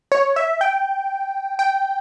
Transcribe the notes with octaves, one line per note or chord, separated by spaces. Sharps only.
C#5
E5
G5
G5